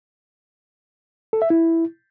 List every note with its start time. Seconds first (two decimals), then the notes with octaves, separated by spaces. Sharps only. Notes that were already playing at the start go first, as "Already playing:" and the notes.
1.33 A4
1.42 E5
1.50 E4